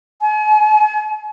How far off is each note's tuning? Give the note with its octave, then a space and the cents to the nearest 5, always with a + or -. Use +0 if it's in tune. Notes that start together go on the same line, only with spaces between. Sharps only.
G#5 +40